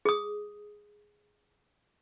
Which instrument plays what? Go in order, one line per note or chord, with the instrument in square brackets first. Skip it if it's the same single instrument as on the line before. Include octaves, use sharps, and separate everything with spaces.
[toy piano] G#4 D#6